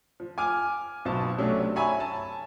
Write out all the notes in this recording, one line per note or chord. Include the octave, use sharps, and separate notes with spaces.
F3
G#5 D6 F6
B1 B2 C5 A5
C3 F#3 A3 C#4 D4
C#5 E5 G#5 A#5 B5 C#6
A5